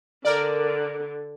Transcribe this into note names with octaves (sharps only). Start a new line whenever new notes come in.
D3 A#4 D5